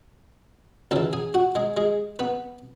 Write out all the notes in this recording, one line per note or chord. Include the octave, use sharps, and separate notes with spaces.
C#2 C#3 E3 A4 A5
G#4 G#5
F#4 F#5
G#3 G#4
G#3 G#4
B3 B4